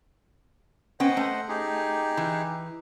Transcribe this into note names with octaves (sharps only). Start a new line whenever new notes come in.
B3 C#4 C5 D#5 F#5 G5
A3
D#4 G4 G#4
E3